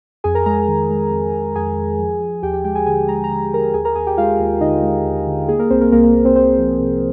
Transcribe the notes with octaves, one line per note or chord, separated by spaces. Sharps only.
F2 G#4 G#5
A#4 A#5
G#3 A#4 A#5
D#3
G#3
F2
F2
F2 G#4 G#5
F2
F3
F3
D#2 G4 G5
G4 G5
G#3 G4 G5
G#4 G#5
D3 G#4 G#5
G#3 A#5
A#5
D3
A#5
D3 A#4 A#5
D#2 G#4 G#5
A#4 A#5
D#2 G#4 G#5
G4 G5
G#3 F4 F5
D#2
D3 D#4 D#5
G#3
D#2
D3
A#3 G#4
A#3 A#4
C2 C4 C5
A#3 A#4
C2 A#3 A#4
A#3 A#4
A#3
C4 C5
A#3 C4 C5
F3
C3